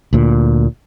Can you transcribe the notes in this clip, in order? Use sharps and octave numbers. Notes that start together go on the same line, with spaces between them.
D2 A#2